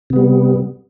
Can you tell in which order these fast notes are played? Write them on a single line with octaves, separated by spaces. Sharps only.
C3 B3 G3